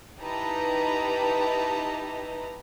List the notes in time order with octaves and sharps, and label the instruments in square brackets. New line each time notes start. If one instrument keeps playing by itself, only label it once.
[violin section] D#4 E4 G4 B4 A5 A#5